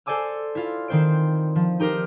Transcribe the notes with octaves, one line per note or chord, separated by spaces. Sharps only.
A4 C5 D5 G#5 D6 E6
E4 F4
D#3 C4 C5 D7
F3
D#4 G4 A#4 C5